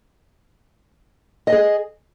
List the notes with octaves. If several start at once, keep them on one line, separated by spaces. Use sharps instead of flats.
G#4 D#5 G#5